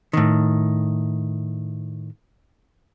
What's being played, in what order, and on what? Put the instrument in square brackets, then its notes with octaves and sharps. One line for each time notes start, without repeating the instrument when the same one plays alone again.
[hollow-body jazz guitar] A2 D#3